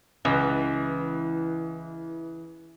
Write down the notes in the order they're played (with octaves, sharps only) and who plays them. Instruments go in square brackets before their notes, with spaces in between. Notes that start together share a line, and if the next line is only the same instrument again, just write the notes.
[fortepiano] C#2 [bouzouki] E3